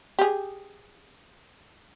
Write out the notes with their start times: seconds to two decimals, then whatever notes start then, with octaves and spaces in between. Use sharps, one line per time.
0.19 G4 G#4